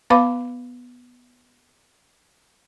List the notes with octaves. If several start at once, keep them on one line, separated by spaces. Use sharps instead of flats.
B3 B4 F5 B5 D6